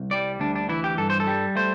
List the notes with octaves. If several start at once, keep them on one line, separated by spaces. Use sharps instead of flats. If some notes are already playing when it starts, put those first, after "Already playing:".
Already playing: C2
G3 D5
D2 D4
D4
E3 E4
G4
G2 A4
C5
A4
G3
A3 C5